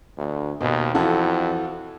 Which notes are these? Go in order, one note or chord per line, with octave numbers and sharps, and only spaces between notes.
D2
D#2 B2
F2 E3 F#4 A4